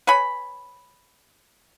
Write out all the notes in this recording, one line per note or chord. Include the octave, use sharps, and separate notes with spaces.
B4 C#5 G#5 B5